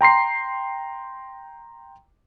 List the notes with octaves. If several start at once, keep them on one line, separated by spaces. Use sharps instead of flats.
G5 A#5 C6 C7